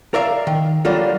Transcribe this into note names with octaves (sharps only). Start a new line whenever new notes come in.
A#4 D5 E5 F5
D#3
D3 F#3 G3 A#3 F4 A4